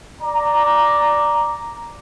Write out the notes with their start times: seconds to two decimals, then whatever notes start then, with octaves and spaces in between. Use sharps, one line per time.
0.20 D5 A#5